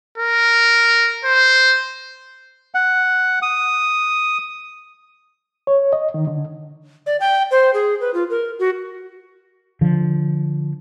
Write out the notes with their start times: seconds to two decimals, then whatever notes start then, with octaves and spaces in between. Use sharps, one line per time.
0.18 A#4
1.25 C5
2.74 F#5
3.42 D#6
5.67 C#5
5.93 D#5
6.14 D#3
6.27 D3
7.06 D5
7.20 G5
7.51 C5
7.74 G#4
8.01 B4
8.14 F4
8.30 A#4
8.59 F#4
9.81 D3 F3